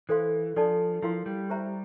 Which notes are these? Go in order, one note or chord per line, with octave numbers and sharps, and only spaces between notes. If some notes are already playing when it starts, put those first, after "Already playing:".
E3 A4 C5 F5 C6
F3 D4 A4 D5 A5
F3 E4 A#4 F5 C6
G3
G4 C5 E5 A#5